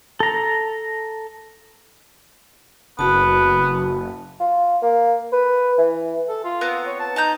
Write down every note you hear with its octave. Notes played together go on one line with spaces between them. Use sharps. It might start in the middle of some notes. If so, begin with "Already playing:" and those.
A4 A#5
F#1 B3 F#4 A5
F4
A#3
B4
E3
A4
F4
B3 C4 A#5
C#5
A5
D#4 A5 A#5 G6